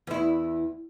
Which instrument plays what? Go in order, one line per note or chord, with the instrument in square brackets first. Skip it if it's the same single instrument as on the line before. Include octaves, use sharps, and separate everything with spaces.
[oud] E2 E4